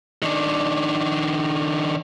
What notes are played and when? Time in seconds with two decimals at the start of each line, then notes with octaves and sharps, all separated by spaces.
0.22 D#3 D4